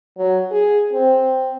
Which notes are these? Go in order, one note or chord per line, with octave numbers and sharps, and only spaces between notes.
F#3
G#4
C4